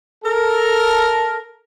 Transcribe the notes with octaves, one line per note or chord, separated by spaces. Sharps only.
A4 A#4